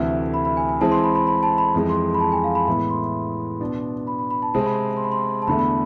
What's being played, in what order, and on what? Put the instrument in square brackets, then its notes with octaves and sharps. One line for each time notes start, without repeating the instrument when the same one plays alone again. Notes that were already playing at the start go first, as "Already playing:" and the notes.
Already playing: [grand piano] D2 C3 E3 A3
[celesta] B5
B5
G#5
G#5
[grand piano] E3 G#3 C4 E4 G#4 [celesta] A5
[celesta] C6
B5
B5
B5
A5
B5
[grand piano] F2 E3 G#3
[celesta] C6
B5
A5
G#5
F5
B5
[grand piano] A2 E3 G#3 B3 E4 [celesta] B5
[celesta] C6
[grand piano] B2 B3 D4
[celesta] B5
B5
B5
A5
[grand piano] C3 G#3 C4 G#4 [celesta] A5
[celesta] B5
B5
C6
B5
C6
A5
[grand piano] E2 D3 A3 [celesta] B5
[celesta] B5